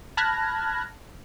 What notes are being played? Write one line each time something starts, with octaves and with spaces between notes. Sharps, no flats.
A5 B5 F6 F#6 G#6 A#6